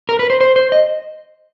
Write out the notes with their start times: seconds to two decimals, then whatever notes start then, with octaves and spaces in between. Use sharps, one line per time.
0.09 A#4
0.19 B4
0.30 C5
0.41 C5
0.56 C5
0.72 D#5